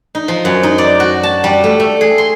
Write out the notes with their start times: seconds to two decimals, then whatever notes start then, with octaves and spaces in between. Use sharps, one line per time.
0.15 D#4
0.28 F3
0.45 F#2
0.63 D#4
0.78 D5
1.00 F#4
1.23 A5
1.44 G3
1.64 A3
1.80 A3
2.01 G#4
2.18 C6